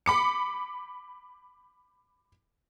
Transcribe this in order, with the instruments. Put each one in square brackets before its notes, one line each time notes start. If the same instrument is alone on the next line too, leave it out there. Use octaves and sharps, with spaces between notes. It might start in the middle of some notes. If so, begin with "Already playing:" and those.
[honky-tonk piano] B5 D6 C#7